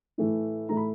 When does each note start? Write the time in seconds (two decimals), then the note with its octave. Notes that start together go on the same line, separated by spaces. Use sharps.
0.18 A2 E3 A3
0.69 A2 E3 A3 A#5
0.77 B5